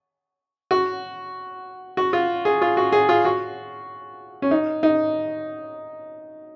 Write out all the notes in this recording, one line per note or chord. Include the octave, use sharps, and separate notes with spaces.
F#4
F#4
F4
G#4
F4
F#4
G#4
F4
F#4
C#4
D#4
D#4